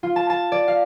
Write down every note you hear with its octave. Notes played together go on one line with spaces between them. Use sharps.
F4
A5
A5
D5
F5